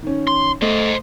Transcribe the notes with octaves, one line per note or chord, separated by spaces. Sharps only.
D#3 C#4
C6
A3 C5 D#5